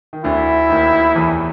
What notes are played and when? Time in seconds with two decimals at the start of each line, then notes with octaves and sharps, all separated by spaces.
0.13 D#3
0.24 D2 D3 E4
0.69 D#2 D#3
1.15 E2 E3